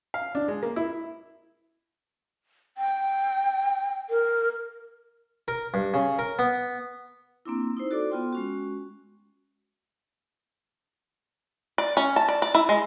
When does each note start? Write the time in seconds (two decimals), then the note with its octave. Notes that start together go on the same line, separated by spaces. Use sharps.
0.14 F5
0.35 D4
0.48 G#3
0.63 A#3
0.76 E4
2.78 G5
4.10 A#4
5.48 A#4
5.74 G2
5.94 C#3
6.19 A#4
6.39 B3
7.45 A#3 C4 D4 E4
7.77 D#4 E4 C5
7.91 F#4 A4 D5 D6
8.10 B3 F4 G5 C6
8.33 G#3 C#4 F#4
11.78 D5
11.97 C#4
12.16 A5
12.28 D5
12.42 D5
12.55 E4
12.69 G#3